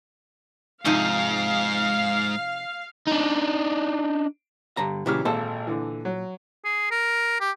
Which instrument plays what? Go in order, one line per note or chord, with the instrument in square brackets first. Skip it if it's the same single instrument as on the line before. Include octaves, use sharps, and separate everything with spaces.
[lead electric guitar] G#2 [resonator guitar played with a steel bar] C3 F3 D#4 [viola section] F5
[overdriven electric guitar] D4 D#4
[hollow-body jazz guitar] G2 D3 A#5
[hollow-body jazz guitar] A#2 C#3 F#3 [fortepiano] E3 G4 F6
[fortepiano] G#1 [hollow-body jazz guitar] A#2 A4 C5
[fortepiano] D3 E3
F#3
[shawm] G#4
A#4
G4